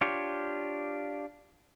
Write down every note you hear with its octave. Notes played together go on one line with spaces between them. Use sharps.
D4 F4 G4 C#5